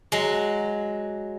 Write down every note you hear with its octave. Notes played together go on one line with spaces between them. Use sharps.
F#3 G#3